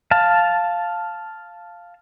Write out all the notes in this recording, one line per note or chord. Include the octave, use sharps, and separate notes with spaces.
F5 A5